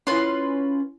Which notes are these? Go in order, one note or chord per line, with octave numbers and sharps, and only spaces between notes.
C#4 E4 F4 B4 C#5 C6